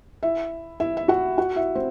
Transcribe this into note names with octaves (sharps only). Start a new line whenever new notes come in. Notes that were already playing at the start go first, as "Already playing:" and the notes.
E4 E5
E4 E5
E5
F#4 F#5
F#4 F#5
E4 E5
C4 C5